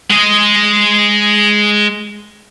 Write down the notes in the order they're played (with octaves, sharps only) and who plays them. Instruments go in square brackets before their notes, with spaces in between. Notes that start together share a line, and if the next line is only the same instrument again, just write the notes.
[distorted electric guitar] G#3 D#5